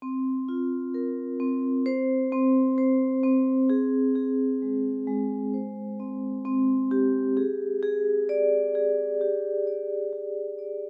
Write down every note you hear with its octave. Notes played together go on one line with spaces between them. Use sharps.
C4
F4
A#4
C4
C5
C4
C5
C4
G#4
G#4
G#3
G#3
C5
C4
C4
G4
G#4
G#4
D5
G#4
G4
D5
G4
D5